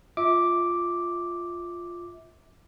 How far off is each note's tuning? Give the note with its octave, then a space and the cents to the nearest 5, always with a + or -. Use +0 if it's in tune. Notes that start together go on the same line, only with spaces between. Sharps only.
F4 +0 E5 -30 D6 +0